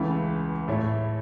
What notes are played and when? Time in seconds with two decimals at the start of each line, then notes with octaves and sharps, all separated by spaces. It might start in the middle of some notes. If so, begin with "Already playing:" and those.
Already playing: C#2 C#3 E3 A3 E4
0.68 A2 A3 E4 C#5